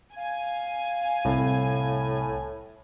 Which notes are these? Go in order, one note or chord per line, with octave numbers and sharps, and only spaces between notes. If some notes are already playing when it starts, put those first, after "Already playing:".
F5 G#5
C2 A2